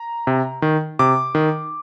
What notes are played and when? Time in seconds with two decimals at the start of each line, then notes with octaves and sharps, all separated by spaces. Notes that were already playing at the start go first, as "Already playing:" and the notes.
Already playing: A#5
0.27 C3
0.62 D#3
0.99 C3 D6
1.35 D#3